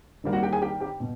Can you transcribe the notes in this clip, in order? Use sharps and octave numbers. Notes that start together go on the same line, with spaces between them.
D#3 G3 A#3
F#4 F#5
G4 G5
G#4 G#5
G4 G5
G4 G5
B2